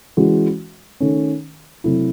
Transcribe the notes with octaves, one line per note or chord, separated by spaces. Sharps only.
E3 G#3 C#4 F#4
D#3 A3 C#4
C3 F#3 A3 C4 E4